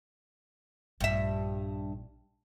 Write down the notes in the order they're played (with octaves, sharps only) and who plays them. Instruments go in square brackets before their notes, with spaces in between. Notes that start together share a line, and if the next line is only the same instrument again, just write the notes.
[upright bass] A#1 [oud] G2 E5